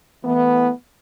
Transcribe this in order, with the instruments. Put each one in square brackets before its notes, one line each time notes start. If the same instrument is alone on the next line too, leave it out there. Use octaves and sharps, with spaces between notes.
[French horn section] E3 A3 B3